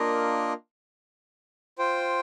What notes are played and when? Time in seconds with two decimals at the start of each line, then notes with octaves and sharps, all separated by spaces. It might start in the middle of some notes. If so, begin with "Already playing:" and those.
Already playing: A#3 D4 F4 A#4 D#5
1.78 F4 C5 G5